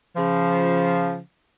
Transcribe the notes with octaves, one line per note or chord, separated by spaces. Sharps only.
C#3 F3